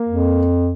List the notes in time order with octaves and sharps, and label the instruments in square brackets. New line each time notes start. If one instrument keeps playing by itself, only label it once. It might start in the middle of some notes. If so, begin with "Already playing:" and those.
Already playing: [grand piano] A#3
[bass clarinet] F2